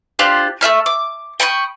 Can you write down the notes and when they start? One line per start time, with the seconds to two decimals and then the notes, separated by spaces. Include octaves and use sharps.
0.19 D4 F4 G4 C5
0.61 A3 E4 E5 F6
0.86 D6
1.40 G5 B5 C#6 D#6